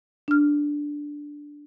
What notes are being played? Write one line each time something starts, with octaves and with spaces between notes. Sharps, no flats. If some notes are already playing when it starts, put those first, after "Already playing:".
D4 F6